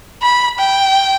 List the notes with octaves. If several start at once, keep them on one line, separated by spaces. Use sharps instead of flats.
B5
G5